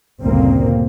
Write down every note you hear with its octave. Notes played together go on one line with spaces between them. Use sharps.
G1 D2 A#2 C#3 A#3 C4